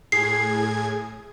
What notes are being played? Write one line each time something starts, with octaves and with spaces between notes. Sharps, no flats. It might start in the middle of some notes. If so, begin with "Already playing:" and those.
A2 G#4 G#6 C7